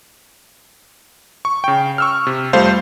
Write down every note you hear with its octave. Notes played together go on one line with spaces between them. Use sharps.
C#6
C#3 G5
C#6 E6 F6
C3
F2 G3 A3 C5 F5